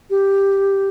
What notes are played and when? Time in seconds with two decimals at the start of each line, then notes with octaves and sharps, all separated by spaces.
0.10 G4